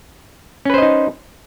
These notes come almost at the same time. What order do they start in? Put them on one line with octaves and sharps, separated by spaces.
C#4 B4 C5 D#5 D#4